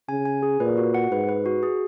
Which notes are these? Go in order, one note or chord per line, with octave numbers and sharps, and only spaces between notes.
C#3 G#5
G#5
G#4
A#2 B4
F#4
F#5
G#2 B4
B4
F#4
G#4